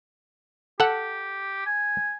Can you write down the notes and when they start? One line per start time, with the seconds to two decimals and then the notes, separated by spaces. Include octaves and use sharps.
0.80 G4 A4 F#5
1.66 G#5